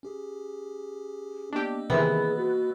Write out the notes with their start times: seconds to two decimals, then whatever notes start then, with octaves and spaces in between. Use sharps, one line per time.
0.03 C#4 G4 G#4
1.53 A#3 B3 D4 G4 D#5 E6
1.90 C3 D#3 E3 B3 G#4
2.37 F#4